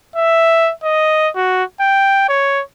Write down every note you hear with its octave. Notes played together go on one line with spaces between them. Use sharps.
E5
D#5
F#4
G5
C#5